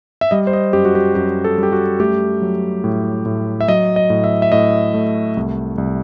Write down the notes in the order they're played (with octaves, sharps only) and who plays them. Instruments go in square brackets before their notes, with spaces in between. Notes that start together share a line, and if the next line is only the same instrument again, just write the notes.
[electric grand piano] E5
G3 D#5
C5
D#5
F#2 G4
F#4
G4
F#2 G4
A4
G3 G4
F#4
A3 G4
F#3
A2
A2
E5
F#3 D#5
D#5
A2
E5
E5
A2 D#5
A3
C2
C2